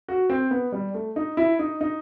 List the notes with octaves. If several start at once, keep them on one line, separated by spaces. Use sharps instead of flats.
F#4
C4
B3
G3
A3
D#4
E4
D#4
D#4